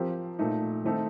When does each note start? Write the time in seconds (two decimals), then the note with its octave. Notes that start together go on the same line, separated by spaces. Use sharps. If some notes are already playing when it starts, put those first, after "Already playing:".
Already playing: F3 C4 G4 A#4
0.39 A#2 A3 D#4
0.84 D#3 A3 C4 D#4 A4